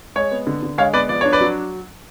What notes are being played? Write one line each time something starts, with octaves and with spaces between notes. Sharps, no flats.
G#3 C#5
B3
D3
D3
G#3 C#5 F5
B3 B4 D5
F3 D5
D4 C#5
B4 D5
F#3